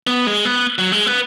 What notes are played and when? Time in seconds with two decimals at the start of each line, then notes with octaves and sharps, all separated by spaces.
0.07 B3
0.27 G#3
0.45 B3
0.78 F#3
0.92 G#3
1.06 B3